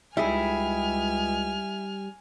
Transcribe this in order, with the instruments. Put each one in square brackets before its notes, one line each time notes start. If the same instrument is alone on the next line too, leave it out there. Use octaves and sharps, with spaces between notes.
[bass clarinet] C#2 [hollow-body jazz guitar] G3 D#4 [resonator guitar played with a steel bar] E4 G#4 [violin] G#5 F6